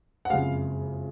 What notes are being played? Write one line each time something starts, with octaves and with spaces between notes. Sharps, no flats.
F#5
F#1 F2 C#3 G#3 F5